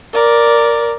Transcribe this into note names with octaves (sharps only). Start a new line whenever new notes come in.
A#4 D5